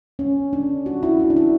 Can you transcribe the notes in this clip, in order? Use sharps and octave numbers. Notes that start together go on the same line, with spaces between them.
C#4
D4
F#4
E4
E4
D4
E4